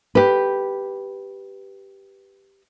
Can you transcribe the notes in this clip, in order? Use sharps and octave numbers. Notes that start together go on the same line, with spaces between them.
G4 B4